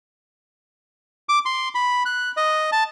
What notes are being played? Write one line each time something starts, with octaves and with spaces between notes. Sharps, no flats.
D6
C6
B5
F#6
D#5
A5